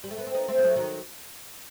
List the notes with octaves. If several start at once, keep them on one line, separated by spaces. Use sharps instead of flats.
G3
A3
B3
C4
B3 D#4
A3 C4
B3
F#3 A3
D#3 F#3